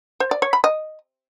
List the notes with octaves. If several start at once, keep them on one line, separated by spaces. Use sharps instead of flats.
C5
D5
C#5
B5
D#5